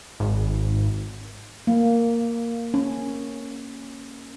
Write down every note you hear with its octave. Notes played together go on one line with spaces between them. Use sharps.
G#1
A#3
C#4